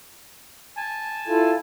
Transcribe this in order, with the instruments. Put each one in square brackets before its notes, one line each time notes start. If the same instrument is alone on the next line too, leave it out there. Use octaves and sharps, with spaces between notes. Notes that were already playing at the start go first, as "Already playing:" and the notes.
[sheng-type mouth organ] G#5 A5
[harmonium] E4 F4 A4